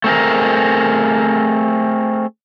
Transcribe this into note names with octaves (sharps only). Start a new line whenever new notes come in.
A3 C4 G#4 A#4